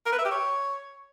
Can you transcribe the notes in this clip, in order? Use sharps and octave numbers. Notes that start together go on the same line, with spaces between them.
A#4
B4
E5
G4
C#5